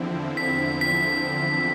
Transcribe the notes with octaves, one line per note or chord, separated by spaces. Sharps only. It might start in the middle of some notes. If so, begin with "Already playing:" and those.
Already playing: E2 D3 F3 C4 E4
B6
B6